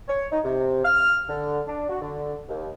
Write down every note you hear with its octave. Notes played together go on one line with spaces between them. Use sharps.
C#5
D#4
C3
F6
D3
D4
F#4
D3
D#2